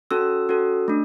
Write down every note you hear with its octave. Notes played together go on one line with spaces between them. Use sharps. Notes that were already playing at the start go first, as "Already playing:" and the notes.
C#4 F#4 A4 E6
C#4 F#4 A4
A3 D4